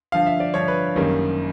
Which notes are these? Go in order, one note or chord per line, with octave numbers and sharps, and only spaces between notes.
G2 D3 F3 F5
E5
D5
G2 D3 F3 C#5
B4
G#1 F#2 D#3 G3 A#3